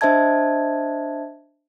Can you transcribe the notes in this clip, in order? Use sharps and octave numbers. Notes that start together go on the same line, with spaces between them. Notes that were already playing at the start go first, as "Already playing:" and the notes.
D4 C5 D#5 E5 A5 G#6